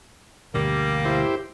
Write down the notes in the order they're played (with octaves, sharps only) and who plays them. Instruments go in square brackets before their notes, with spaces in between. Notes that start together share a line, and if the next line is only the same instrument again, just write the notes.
[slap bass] D2 G2 B2 [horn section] G3 A#3
[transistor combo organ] E4 G4 C5